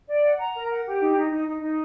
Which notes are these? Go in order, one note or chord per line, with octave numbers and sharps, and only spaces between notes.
D5
F#5
A#5
A#4
F#5
G4
D#4
D#4
D#4
D#4
D#4